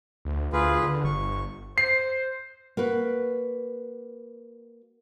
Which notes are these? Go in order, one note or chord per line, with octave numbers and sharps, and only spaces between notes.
D2
D2 F4 G#4 B4
D3
G1 C#6
C5 C7
A#3 F#4 B4